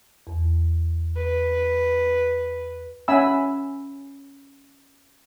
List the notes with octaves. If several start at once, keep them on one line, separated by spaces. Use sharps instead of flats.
E2
B4
C#4 E5 F#5 G#5 B5 E6